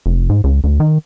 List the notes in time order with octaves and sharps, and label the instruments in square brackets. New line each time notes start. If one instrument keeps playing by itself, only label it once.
[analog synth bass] F1
G#2
C#2
D2
D#3